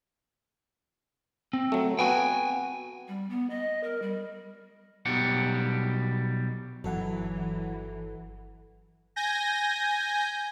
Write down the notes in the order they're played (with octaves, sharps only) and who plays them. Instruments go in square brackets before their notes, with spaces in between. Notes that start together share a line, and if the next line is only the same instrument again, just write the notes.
[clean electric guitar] C4
[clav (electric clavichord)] F#3 A3
[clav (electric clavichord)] B3 F#4 [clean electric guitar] G5 G#5
[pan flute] G3
B3
D#5
A#4
G3
[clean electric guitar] B1 B2 G3 G4 F#5
[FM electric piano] G1 A4 F#5 [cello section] E3 [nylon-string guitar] F#3
[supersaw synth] G#5 G6 A#6